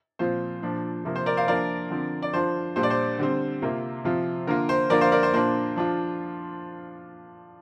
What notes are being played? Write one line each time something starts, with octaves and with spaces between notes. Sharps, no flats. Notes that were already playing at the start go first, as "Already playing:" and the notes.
A#2 F3 C4 F4 C5
A#2 F3 D4
C3 F3 A#3
C5
A#4 D5
C5 F5
F3 A#3 D4 F4 A#4 D5
D3 F3 C4
D5
F3 D4 F4 C5
A#2 G3 D4 F4 C5
D5
C5
D3 G3 C4
C3 A#3 F4
C3 F3 C4 F4
D3 A#3 F4 A#4
C5
D3 F3 A#3 F4 A#4 D5
C5 F5
A#4 D5
C5
A#2 A#3 D4 F4 C5
F3 D4 F4